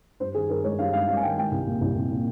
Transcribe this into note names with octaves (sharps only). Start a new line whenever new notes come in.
G2 C5
D#3 G#4
G2 A#4
G#3 C#5
G2 F5
G#3 F5
G#3 F5
G#5
D#3 G5
G#3 G5
C2
A#2
C2
C2
A#2